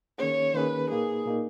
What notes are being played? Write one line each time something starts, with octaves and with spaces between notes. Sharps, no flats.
D#3 A#3 C#4 G#4 C#5
D#3 A#3 C#4 G#4 B4
A#2 A#3 D#4 G#4
A#2 A#3 D#4